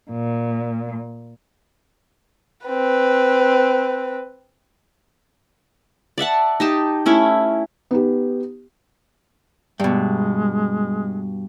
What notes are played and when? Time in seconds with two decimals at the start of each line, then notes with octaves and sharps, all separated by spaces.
0.11 A#2
2.67 C4 B4
6.18 D5 E5 F#5 A5
6.60 D#4 G4 A5
7.06 A3 C#4 E4 E5
7.91 B3 D#4 G4
9.80 G2 B2 G#3